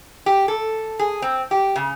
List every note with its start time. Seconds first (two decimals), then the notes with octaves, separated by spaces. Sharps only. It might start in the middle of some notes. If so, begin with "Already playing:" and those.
0.26 G4
0.48 A4
0.99 G#4
1.22 C4
1.51 G4
1.76 C#3